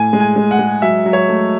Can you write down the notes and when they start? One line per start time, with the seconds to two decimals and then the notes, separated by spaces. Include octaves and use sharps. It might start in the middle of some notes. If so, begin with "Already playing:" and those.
Already playing: A2 G#5
0.13 G#3
0.20 G#5
0.36 G#3
0.51 F#5
0.59 G#3
0.82 F#3 E5
1.06 F#3
1.13 C#5
1.29 A3